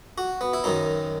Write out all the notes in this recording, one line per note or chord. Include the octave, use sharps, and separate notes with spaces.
F#4
B3
E4
F#2 D#3 D#4